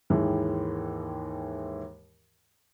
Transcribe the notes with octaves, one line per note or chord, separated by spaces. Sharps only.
D#2 G#2 D#3 E3 G#3